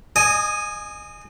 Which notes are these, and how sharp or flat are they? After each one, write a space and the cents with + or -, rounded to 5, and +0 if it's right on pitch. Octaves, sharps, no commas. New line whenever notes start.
D#5 -30 G#5 +0 D#6 +0